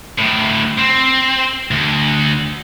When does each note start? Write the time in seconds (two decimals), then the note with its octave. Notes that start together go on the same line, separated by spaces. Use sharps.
0.18 D2 A2
0.78 C4
1.71 D2